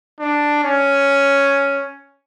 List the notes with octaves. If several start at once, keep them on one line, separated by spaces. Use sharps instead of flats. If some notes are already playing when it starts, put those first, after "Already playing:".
D4
C#4